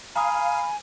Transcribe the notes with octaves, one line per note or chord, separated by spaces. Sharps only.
F5 G#5 A#5 B5 D#6